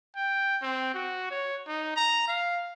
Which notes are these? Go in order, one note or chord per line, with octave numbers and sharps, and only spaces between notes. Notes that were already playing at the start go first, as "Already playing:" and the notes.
G5
C4
F#4
C#5
D#4
A#5
F5